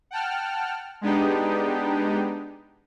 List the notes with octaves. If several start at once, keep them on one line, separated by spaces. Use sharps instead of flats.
F#5 G5 A5 F6
G#3 B3 D4 D#4 G4